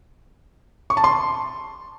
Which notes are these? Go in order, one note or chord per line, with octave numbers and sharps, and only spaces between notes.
C#6
A5
C6